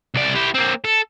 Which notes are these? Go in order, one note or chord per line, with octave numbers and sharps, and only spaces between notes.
C2 D5
E4 G4
A#3 C4
A4